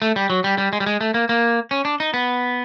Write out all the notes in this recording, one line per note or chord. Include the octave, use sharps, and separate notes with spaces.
A3
G3
F#3
G3
G3
G#3
G3
G#3
A3
A#3
A#3
C#4
D4
D#4
B3